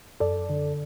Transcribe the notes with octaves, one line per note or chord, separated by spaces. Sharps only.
F#2 A4 D5
D3